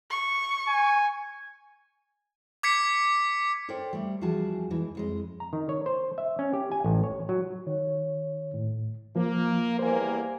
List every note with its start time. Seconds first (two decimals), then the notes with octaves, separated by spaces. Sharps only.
0.10 C#6
0.68 G#5
2.63 D6 G#6 B6 C#7
3.68 A4 A#4 C5 D5 G5
3.93 G3 A3
4.21 E2 F3 G3 F#4 G#4 A5
4.70 E2 E3 G#3
4.95 F2 G#3 D#5
5.40 A#5
5.53 D#3
5.69 C#5
5.86 C5
6.18 E5
6.39 C#4
6.53 G4
6.72 G#5
6.84 A1
7.04 C#5
7.29 F#3
7.67 D#3 C#5
8.54 A2
9.16 F3 A#3
9.79 E2 G3 A#3 C5 G#5